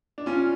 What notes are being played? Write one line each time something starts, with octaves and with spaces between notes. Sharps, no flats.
D4
C#4 F4